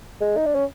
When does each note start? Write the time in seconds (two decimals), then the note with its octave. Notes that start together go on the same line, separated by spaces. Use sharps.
0.21 G#3
0.37 D#4
0.46 D4
0.55 C#4